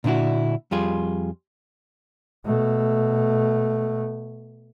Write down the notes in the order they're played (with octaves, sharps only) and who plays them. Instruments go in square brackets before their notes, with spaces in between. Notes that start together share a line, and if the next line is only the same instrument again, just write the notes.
[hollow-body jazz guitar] A#2 D3 D4 E4 F#4
F2 G3 F4 G#4
[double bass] B2 A3